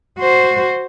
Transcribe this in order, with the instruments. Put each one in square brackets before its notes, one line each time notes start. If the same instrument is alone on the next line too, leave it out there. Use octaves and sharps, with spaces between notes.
[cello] F#4 C5